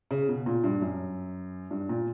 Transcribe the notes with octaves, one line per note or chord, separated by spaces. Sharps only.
C#3
B2
A#2
G2
F#2
G2
A#2